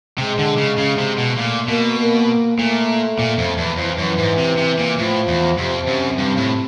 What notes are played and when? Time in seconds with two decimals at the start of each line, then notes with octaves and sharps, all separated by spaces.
0.18 C3 G#3
0.39 D3
0.58 C#3
0.78 C#3
0.98 C3
1.18 B2
1.38 A#2 A3
1.68 B2 A#3
1.98 A#3
2.58 A#2 A3
3.19 A#2
3.38 F2
3.58 E2
3.77 F2 E3
3.98 F#2
4.18 G#2
4.38 C3
4.57 C3
4.79 A#2
4.98 A2 F3
5.28 E2
5.58 F2 C3
5.88 F#2
6.18 G2
6.37 A2